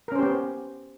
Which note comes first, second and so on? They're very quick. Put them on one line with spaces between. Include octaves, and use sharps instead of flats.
A#4 C#4 C5 G4 B3